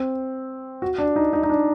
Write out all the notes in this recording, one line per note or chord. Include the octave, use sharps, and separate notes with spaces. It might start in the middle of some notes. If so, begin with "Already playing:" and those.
Already playing: C4
F#4
D4
D#4
D#4
D#4
D4